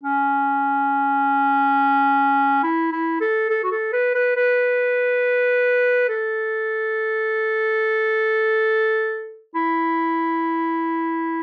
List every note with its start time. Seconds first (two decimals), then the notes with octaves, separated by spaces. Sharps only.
0.03 C#4
2.63 E4
2.92 E4
3.21 A4
3.49 A4
3.63 F#4
3.71 A4
3.93 B4
4.14 B4
4.36 B4
6.09 A4
9.55 E4